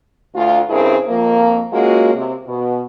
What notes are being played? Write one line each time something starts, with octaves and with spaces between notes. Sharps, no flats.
D2 F4
G2 C#3 C4 E4 G#4 A#4
F2 A#3
G#3 A#3 C#4 F4 F#4
C3
B2